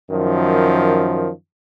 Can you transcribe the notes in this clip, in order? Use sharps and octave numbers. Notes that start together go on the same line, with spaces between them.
F#2 D#3 F3